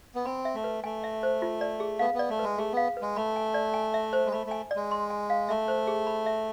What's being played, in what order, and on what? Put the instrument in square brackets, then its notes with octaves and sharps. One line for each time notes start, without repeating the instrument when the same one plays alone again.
[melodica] B3
[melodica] C4 [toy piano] B5
[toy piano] E5
[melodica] A3
[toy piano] B4
[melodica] A3 [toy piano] G#5
[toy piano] E5
C5
F4
D5
G#4
[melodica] B3 [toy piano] F5
[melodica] B3
[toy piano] D5
[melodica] A3
[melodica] G#3 [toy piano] B4
[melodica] A3 [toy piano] G#4
[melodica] B3 [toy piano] F5
[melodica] G#3 [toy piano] B4
[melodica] A3 [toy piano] B5
[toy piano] G#5
D5
G#5
E5
C5
[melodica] G#3
[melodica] A3 [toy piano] B5
[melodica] A3 [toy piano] G#5
[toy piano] D5
[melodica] G#3
[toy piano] C6
G#5
F5
[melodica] A3 [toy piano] E5
[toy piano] C5
G#4
B5
E5